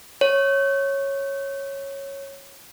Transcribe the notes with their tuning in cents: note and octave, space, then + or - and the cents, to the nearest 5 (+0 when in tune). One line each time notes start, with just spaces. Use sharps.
C#5 -10